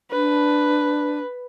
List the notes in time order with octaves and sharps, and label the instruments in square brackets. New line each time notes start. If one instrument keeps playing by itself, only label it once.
[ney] D4 [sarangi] B4